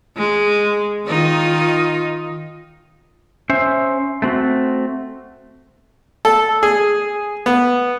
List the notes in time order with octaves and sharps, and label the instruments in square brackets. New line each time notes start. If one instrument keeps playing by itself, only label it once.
[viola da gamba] G#3
D#3 D#4 F4
[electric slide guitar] C#4 C5 E5
A3 C4 F#4
[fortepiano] A4
G#4
B3